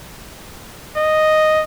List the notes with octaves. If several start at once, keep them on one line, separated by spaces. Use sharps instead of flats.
D#5